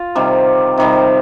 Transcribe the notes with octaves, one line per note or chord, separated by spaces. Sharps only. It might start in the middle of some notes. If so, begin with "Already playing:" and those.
Already playing: F4
C3 D#3 G3
C3 D#3 G3